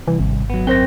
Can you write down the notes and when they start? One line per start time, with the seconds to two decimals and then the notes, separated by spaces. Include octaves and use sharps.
0.08 C2 E3
0.20 G#1
0.50 F#3 B3
0.67 F#2 C4 A#4 C5 G5 A#6